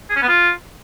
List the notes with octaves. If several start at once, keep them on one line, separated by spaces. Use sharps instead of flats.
G#4
C#4
B3
F4